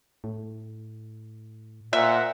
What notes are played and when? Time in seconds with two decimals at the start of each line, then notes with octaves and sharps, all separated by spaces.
0.24 A2
1.93 A#2 A#4 C5 E5 F#5